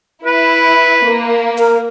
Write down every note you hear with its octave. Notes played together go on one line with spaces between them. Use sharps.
E4 B4
A#3
A#4